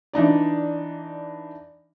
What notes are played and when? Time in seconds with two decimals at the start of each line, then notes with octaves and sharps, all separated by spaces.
0.13 E3 D4 D#4 D5